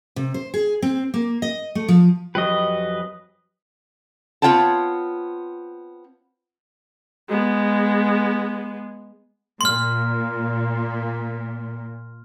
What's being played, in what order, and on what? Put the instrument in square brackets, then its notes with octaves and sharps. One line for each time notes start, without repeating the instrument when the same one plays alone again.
[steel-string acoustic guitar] C3
C5
G#4
C4
A#3
D#5
A3
F3
[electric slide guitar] F2 F#3 G4 [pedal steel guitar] B4 D#5
[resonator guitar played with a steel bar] B3 C4 F4 C#5 G5 A5
[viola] G#3 B3
[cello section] A#2 [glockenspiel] C6 F6